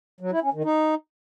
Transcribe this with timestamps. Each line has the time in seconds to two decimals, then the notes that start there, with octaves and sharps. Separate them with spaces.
0.20 F#3
0.31 E4
0.42 C#4
0.53 D#3
0.64 D#4